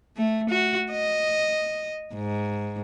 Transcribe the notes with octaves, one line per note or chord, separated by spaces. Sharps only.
A3
F#4
D#5
G#2